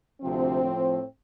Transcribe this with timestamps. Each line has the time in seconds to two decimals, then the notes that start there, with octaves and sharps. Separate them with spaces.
0.22 D2 C3 F3 C4
0.63 A2 F3